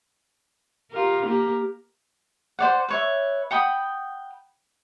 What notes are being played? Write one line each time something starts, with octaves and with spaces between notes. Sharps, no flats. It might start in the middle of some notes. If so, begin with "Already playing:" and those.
F4 G4 A#4
A#3 G4 A#4
C5 D5 F#5
B4 C#5 E5
F#5 G5 B5 D#6